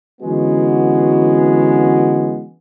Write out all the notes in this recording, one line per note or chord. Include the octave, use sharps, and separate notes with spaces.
D3 E3 G#3 B3 C#4 F#4